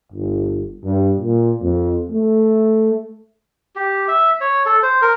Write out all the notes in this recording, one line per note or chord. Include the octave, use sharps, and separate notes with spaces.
G1
G2
A#2
F2
A3
G4
E5
C#5
A4
C5
A#4